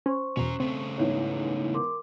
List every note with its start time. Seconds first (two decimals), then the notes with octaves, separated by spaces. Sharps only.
0.06 C#4 C5 C6 C#6
0.37 E2 B2 C#4 A#5
0.60 C#3 A3 C4
0.98 E2 G#2 E3 C#5 E5
1.74 A#4 C6 D6